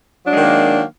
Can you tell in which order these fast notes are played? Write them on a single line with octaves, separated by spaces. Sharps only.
F#3 D4 G#3 D#3 A#3